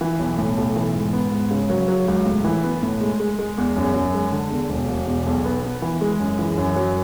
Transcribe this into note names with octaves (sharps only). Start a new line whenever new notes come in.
E3
B1
A2
B1
E3
G#2
B3
G#2
C#3
F#3
F#3
C#2
A2
E3
B3
A2
G#3
G#3
G#3
E2
F#2
F#2
G#3
D3
E2
E1
E1
E2
B1
B3
B3
E3
G#3
F#2
E3
F#2
F#3